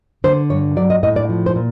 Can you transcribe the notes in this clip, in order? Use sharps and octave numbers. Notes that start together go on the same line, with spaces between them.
D3 C5
G2 C#5
F#3 D5
D#5
A2 D#5
D5
F3
C5
A#2